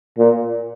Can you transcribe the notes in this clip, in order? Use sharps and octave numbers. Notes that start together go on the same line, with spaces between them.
A#2